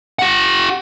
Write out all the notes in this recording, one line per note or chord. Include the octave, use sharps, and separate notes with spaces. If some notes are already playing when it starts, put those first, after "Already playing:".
G4 F#5